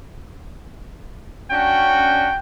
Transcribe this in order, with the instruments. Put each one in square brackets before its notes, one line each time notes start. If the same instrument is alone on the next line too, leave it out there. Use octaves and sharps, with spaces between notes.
[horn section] C#4 D4 F#4 [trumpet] G5